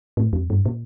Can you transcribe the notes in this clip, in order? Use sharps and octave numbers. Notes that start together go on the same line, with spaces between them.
A2
F2
G2
A#2